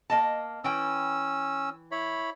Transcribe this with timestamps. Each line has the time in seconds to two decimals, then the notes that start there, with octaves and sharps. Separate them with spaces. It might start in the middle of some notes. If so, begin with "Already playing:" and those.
0.10 A#3 D#5 A5
0.64 E3 C#4 G5 E6
1.91 E4 C#5 B5